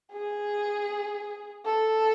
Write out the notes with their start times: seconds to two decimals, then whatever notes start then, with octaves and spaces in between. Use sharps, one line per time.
0.13 G#4
1.65 A4